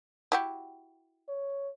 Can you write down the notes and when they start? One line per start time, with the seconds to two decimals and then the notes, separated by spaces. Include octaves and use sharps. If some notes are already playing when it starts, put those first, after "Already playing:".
0.32 E4 F#4 G4
1.29 C#5